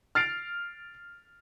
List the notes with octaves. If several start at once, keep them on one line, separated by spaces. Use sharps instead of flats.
F6 A6 C7 D7 F7